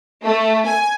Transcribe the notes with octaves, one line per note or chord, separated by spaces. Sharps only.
A3
G#5